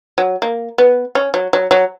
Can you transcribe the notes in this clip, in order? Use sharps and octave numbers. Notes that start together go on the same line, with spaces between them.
F#3
A#3
B3
C#4
F#3
F#3
F#3